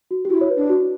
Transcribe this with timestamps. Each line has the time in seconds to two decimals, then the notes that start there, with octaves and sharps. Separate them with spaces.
0.11 F#4
0.25 G4
0.30 E4 F#4
0.41 C#5
0.50 B4
0.56 D4
0.70 F#4